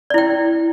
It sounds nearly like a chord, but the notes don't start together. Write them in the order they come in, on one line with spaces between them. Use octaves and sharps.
D5 E4 G5